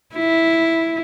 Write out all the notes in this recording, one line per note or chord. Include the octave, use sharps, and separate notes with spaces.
E4